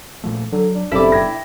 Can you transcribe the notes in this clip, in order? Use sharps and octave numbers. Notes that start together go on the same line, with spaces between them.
A#2 F3 A3
D3 F#3
D4
F#1 F#2 B2 G3 C4 E4 A4 D5
G5 G#6 A#6